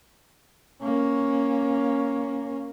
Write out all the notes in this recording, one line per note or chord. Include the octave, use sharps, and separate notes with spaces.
A#3 C#4